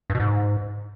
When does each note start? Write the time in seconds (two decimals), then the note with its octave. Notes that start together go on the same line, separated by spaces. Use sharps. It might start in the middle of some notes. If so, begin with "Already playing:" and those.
0.10 G2
0.15 B2
0.20 G#2